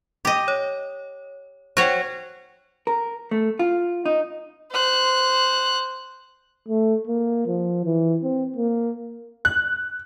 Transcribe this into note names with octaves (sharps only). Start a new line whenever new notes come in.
G4 D#5
C#5
F#4 C5 C#5 G5
A#4
A3
F4
D#4
C5 F#6
A3
A#3
F3
E3
C4
A#3
F#6